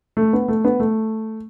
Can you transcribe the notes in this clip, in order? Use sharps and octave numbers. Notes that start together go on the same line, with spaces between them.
A3
B3
A3
B3
A3